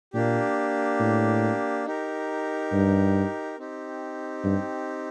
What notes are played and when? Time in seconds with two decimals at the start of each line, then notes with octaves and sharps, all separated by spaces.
0.13 A#2 A#3 D4 G4
1.00 A2
1.86 D#4 G4 A#4
2.72 G2
3.58 C4 D#4 G4
4.44 G2